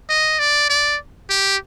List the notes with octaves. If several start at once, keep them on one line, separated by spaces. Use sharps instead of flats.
D#5
D5
D5
G4